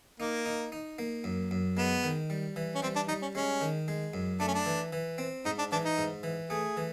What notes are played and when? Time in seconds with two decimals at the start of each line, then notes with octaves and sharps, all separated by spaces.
0.20 A#3 D#4
0.46 D#4
0.72 D#4
0.99 A#3
1.24 F#2
1.51 F#2
1.77 G#3 B3
2.03 D#3
2.30 G3
2.56 E3
2.75 C#4
2.82 G3 C4
2.96 D4
3.08 G3 D#4
3.22 C#4
3.35 G#3 C#4
3.61 D#3
3.88 G#3
4.14 F#2
4.40 A3 D4
4.48 C#4
4.54 D4
4.66 E3
4.93 E3
5.18 C4
5.45 G#2 D#4
5.58 D4
5.72 E3 D4
5.85 D#4
5.98 G#2
6.23 E3
6.50 A3 G#4
6.77 E3